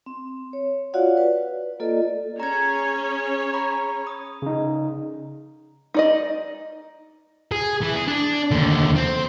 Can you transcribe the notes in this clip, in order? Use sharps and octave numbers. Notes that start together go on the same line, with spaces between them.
C4
C#5
F4 F#4 C#5 D5 F5 F#5
B4
A#3 F4 A4 D5 D#5
C#4 G#4 C#5 A#5 G#6
A#5 B5 C#6
D#6
C#3 D#4
D#4 D5 D#5
G#4
E3
G#4
D4
D#2 D3
C4